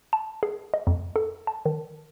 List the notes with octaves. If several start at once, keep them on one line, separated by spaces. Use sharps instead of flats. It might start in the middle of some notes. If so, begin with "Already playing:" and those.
A5
G#4
D#5
F2
A4
A5
D#3